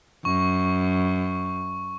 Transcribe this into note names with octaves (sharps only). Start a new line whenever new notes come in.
F#2 C#6